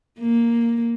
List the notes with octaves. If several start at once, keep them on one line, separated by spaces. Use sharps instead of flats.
A#3